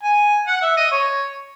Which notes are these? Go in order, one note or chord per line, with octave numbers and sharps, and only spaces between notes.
G#5
F#5
E5
D#5
C#5